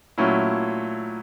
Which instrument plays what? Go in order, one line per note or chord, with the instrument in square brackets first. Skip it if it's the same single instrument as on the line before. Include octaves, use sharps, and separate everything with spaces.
[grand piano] A#2 F#3 A3 C#4 E4